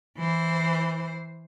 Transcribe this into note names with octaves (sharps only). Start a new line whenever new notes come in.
E3 C5